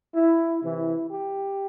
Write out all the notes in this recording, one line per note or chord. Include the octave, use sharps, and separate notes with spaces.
E4
C3 E3 E4
G4